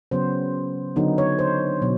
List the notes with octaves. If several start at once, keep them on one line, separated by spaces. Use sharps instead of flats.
C#3 F#3 B3 C5
D3 F#3 B3 D#4
C#5
C5
B2 F#3